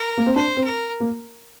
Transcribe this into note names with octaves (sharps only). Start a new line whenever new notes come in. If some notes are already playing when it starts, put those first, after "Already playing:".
Already playing: A#4
A#3
C4
D4 C5
C4
A#4
A#3